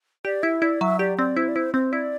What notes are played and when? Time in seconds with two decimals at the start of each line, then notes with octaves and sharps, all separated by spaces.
0.25 G4 D5
0.43 E4 E5
0.62 E4 D5
0.81 F#3 E5
0.99 G4 D5
1.18 C4 D5
1.37 E4 C5
1.48 D5
1.56 E4 C5
1.74 C4 C5
1.92 E4 D5